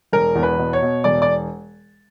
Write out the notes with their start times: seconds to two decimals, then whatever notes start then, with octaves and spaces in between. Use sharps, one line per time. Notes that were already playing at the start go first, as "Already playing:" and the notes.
0.13 E1 A#4
0.35 E2
0.43 B4
0.58 B2
0.73 C#5
0.82 B2
1.04 E1 D5
1.22 D5